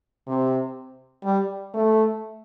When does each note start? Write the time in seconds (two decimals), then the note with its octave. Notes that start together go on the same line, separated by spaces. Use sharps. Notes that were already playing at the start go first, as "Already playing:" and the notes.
0.27 C3
1.24 G3
1.74 A3